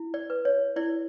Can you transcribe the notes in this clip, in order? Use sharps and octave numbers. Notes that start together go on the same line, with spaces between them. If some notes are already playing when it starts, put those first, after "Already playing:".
Already playing: E4
D5
B4
C#5
E4 D5